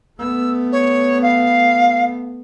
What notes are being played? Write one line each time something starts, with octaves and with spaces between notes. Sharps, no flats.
A3 B3 E6
C#5
F5